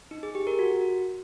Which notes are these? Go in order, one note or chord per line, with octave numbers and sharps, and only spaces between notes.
D#4
G#4
G4
A#4
F#4